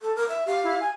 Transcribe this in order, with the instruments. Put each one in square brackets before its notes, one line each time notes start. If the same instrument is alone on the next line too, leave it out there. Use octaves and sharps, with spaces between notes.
[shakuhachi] A4
A#4
E5
[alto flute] G4 [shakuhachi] F5
[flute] E4
G#5